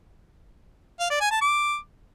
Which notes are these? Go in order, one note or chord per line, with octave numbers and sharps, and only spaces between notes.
F5
D5
G#5
A5
D6